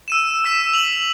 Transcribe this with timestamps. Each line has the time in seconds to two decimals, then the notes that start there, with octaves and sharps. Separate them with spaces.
0.08 E6 D#7 E7
0.45 E6 B6 E7
0.73 F7 F#7